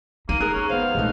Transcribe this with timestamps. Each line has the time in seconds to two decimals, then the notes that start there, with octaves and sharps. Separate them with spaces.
0.29 A#3 D#4 D#7
0.40 G#4 A#4 F#6
0.53 C#4
0.69 B3 C5 F5
0.95 A#1 G#3 A3 D#4